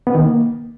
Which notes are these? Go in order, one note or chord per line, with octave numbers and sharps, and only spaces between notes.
B3
D#3
A#3